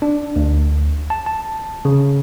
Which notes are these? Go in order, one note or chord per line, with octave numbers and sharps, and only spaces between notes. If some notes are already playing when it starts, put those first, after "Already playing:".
D4
D2
A5
A5
C#3